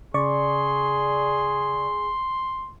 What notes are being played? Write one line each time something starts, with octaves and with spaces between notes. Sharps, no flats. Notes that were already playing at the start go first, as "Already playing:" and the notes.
C#3 G#4 D5 C6 C#6